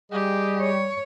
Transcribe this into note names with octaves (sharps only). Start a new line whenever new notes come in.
G3 G4 G#4 D#5
C#5